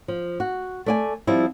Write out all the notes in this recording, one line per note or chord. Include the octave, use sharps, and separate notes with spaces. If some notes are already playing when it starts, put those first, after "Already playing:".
F3
F#4
A3 D5 G#5
F3 G3 C4 E4